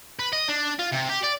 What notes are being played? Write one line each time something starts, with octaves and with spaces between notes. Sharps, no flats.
B4
D#5
D4
F4
C3
G4
D5